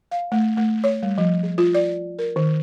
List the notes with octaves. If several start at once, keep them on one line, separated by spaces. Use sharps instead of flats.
F5
A3
A3
C#5
G3
F3
G#4
F4
D5
A#4
D#3